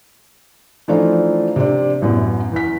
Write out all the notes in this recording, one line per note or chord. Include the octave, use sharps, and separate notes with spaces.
E3 F3 A3 D4 D#4 F4
C3 C4 D4
A1 F#2 B3
E2 B6